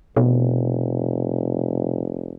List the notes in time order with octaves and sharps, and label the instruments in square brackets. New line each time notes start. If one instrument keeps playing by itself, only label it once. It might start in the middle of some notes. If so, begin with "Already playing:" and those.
[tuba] F1 [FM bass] B2